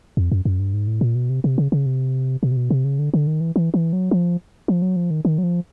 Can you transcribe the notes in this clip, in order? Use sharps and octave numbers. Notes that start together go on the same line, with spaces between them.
F2
F#2
F#2
G2
G#2
A2
A#2
B2
C3
C3
C#3
C#3
C3
B2
C3
B2
C3
C#3
D3
D3
D#3
E3
E3
E3
F#3
F3
F3
F#3
F3
D#3
D#3
F#3
F3